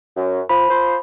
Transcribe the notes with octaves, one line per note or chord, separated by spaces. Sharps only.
F#2
F3 B5
F3 C5